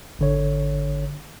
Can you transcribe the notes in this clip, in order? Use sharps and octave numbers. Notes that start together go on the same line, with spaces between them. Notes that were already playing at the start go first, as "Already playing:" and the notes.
G#1 D3 C#5